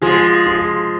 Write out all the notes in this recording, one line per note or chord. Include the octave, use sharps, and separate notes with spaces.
F3 G#3 F4 G#4
F4 G#4